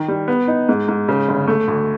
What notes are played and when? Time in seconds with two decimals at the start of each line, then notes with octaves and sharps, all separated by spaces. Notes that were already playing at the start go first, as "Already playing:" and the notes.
Already playing: D#3
0.08 G3
0.28 B3
0.48 D#4
0.69 G#2
0.88 G#2
1.08 C#3
1.29 G1
1.48 A3
1.68 D2